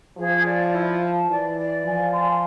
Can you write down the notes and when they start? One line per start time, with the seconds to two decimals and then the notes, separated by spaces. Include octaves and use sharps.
0.17 F3 G#4
0.45 D5
0.73 E4
1.01 A5
1.29 E3 D5
1.57 D5
1.85 F3 G#5
2.13 C6